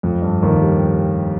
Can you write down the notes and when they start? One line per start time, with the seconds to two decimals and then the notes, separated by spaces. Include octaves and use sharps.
0.03 F2
0.22 G2
0.42 D#2 D#3
0.62 G3